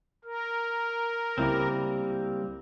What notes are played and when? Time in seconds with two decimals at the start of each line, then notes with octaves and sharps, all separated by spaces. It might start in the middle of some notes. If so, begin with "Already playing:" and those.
0.24 A#4
1.38 C#2 G3 A#3 C4 E4